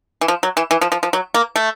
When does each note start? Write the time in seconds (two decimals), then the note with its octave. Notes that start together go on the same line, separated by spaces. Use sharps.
0.21 E3
0.28 F3
0.43 F#3
0.57 E3
0.71 E3
0.81 F3
0.92 F3
1.03 F3
1.13 F#3
1.34 A#3
1.56 A3